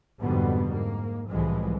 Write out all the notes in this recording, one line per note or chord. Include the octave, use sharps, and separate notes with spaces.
F2 G#2 B2 D3 G3 B3
G#2 A#3
C2 A2 E3 F3 G3 G#3